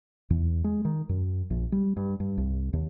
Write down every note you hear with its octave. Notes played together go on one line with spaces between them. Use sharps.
E2
G#3
D#3
F#2
A#1
G3
G2
G2
C2
D#2